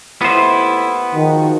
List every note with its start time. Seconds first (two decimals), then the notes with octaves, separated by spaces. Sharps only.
0.21 D#2 A3 B3 E4 C5
1.15 G#2 D#3 F3 F#4